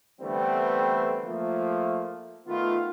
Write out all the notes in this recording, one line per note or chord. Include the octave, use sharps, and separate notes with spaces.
D3 E3 G3 A3 B3 C4
F3 A3 A#3
D#3 A3 B3 F4